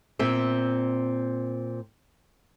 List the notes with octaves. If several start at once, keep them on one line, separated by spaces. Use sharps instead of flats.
A#2 C4 E5